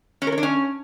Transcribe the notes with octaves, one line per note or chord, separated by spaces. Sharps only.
C#4
A#4
C#5
D4
C#4